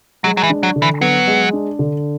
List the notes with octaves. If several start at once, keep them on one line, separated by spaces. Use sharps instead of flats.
F#3 G#3
F#3
E3
D4
F#3
D3
E3
F#3 B3
G#3
D4
D3